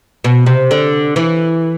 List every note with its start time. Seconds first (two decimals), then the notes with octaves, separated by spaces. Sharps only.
0.24 B2
0.46 C3
0.71 D3
1.16 E3